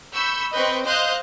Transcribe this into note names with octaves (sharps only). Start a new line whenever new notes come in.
B5 C#6 E6 G6
C4 B4 D#5 C#6 G6
C5 D#5 F5 D#6 F#6 G6